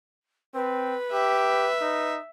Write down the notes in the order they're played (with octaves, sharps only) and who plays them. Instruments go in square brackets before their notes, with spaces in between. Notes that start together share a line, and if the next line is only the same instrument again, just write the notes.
[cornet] C4 [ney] B4
[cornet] G4 [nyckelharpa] E5
[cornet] D#4